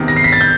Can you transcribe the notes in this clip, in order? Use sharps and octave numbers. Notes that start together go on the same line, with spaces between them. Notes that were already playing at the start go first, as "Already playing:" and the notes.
Already playing: E2 C3 D#3
A#6
C7
B6
A6
G6